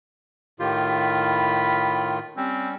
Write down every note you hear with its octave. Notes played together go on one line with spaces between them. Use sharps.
A2 D#3 F4 G4
B5
G3 C4 C#4